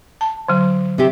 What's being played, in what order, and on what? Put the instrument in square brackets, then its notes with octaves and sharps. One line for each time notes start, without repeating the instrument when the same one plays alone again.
[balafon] A5
D3 F#3
[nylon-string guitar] C3 C4 G4